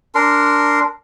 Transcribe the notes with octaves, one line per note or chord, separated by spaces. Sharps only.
D4 A#4 C6